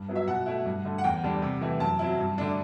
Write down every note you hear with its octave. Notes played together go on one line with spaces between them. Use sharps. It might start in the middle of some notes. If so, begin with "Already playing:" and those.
Already playing: G2
F#3 B3 E4
E5
B2 F#5
A3 E4
G2
D3 A3
F#5
E2 G5
D3 G3 D4
C3
E3 A3 E4
F#2 A5
F#3 C4 E4
G2
D3 A3 D4